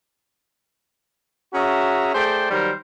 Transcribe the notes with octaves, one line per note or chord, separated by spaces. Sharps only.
C#4 F#4 G#4 E5 A#5
A3 G#4 C5 D5 G5
D#3 F#3 G3 A#4 C5